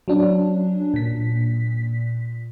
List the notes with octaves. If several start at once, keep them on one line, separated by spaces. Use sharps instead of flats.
F#3 C#4 D4
A#2 B6